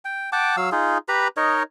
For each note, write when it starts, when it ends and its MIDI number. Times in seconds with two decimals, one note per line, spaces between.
0.05 0.30 79
0.32 0.56 78
0.32 0.56 79
0.32 0.56 81
0.32 0.56 86
0.57 0.70 54
0.57 0.70 77
0.57 0.70 88
0.72 0.98 63
0.72 0.98 65
0.72 0.98 68
1.08 1.28 67
1.08 1.28 71
1.08 1.28 82
1.08 1.28 83
1.37 1.63 63
1.37 1.63 70
1.37 1.63 73
1.37 1.63 75